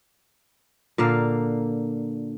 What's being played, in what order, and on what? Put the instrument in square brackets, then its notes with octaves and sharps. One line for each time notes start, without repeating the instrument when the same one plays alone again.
[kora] A#2 D3 A#3 F5